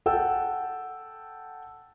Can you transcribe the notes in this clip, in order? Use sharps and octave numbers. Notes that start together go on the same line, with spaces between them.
A4 F#5 G5 E6